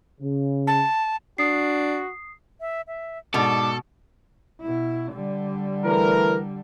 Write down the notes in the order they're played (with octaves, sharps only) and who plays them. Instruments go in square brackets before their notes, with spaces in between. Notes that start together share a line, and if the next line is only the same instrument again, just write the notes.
[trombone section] C#3
[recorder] A5
[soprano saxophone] D4 [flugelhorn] F#4 [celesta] D#6 C7
[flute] E5
E5
[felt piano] G#2 D5 [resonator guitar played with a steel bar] B2 [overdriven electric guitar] A4 [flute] D6
[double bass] B2 E4
D3 G3
[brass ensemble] E3 A3 A#4